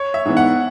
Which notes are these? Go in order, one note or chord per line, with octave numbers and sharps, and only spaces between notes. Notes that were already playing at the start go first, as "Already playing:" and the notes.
Already playing: C#5
E5
G#2 E3 B3
F#5